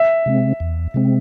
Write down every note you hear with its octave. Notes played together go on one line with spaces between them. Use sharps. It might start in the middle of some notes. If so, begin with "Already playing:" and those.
Already playing: E5
C3 G#3 C4
E2
C3 G#3 C4